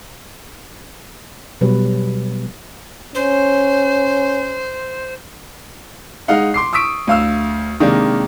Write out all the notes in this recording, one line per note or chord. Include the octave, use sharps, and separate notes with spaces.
B2 F#3 G3 B4
C#4 C5
G#3 D#4 F5 F#5
C6 D6 C7
C#6 D#6 E6 B6 D7
D2 F5 E6
C3 D#3 G#3 A#3 D4